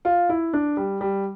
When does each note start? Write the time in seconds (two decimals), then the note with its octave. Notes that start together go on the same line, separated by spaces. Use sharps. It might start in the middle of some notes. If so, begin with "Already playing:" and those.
0.05 F4
0.29 E4
0.53 D4
0.77 G3
1.01 G3